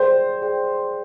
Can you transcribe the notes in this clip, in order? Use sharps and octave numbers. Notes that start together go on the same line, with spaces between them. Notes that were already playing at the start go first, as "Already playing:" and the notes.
Already playing: G#4 C5 D5 G5
G#4 D5 G5